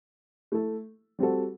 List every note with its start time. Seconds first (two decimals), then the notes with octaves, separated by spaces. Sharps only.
0.52 A3 E4 A4
1.19 G3 C4 F#4 A4